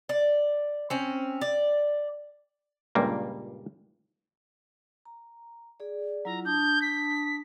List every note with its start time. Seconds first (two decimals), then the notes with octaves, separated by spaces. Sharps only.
0.09 D5
0.90 C4 C#4
1.41 D5
2.95 C#2 G2 A#2 G3 A#3
5.05 A#5
5.80 G#4 D5
6.25 F#3 E4 F4 A#5
6.45 D4 A5 D#6 G6
6.82 B6